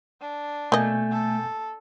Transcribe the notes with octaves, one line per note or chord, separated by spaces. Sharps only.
D4
B2 A3 A#3 D#5 G#5 G6
A4